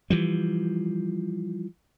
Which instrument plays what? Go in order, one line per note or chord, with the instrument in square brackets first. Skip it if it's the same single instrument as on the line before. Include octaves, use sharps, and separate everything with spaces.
[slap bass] E3 F3 G3